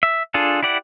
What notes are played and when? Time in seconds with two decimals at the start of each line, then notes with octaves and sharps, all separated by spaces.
0.03 E5
0.34 D4 F4 G#4 A4
0.63 E4 G4 D5 F#5